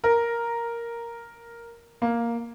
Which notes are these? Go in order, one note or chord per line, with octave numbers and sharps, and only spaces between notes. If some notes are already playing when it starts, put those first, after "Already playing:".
A#4
A#3